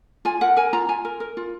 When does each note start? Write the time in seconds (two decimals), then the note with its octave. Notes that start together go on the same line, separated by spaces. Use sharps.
0.25 F4 G#5
0.41 A#4 F#5
0.57 A#4 G#5
0.73 F4 A#5
0.88 F4 G#5
1.05 A#4
1.20 A#4
1.37 F4